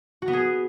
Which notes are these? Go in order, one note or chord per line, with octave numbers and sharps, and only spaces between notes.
F#4
B3
G#4